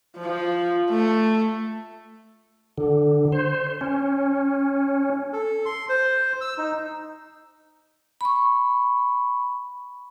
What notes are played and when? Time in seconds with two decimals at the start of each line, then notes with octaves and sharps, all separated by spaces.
0.18 F3
0.90 A3
2.77 D3
3.32 C5
3.81 C#4
5.33 A4
5.66 C6
5.89 C5
6.41 E6
6.58 D#4
8.21 B5 C#6